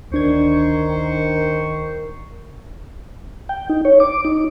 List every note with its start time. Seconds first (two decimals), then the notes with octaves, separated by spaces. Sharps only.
0.12 D2 D#3 D4 A#4 C5 C#6 G#6
3.49 G5
3.70 D#4
3.85 C#5
4.00 D6
4.25 D#4